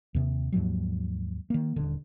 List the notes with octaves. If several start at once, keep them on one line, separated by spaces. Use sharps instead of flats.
D#2 C3
D#2 G#2 F3 F#3
D#3 A#3
D#1 D3